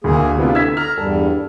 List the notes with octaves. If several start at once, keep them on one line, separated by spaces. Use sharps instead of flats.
D2 D3 A#3 G#4
C3 A3 B3 D4 E4 F4
D3 E6 G#6 B6
A#5 F6
E2 G2 G3 A4